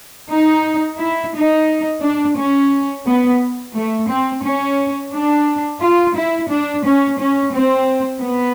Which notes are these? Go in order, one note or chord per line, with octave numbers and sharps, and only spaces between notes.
D#4
E4
D#4
D4
C#4
B3
A3
C4
C#4
D4
F4
E4
D4
C#4
C#4
C4
B3